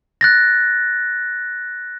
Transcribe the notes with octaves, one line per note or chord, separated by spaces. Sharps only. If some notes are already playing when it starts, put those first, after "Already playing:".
F#6 A6 A#6